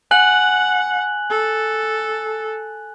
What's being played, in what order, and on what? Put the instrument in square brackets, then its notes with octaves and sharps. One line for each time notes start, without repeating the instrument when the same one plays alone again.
[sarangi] F#5 [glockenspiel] G#5 F#6 F#7
[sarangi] A4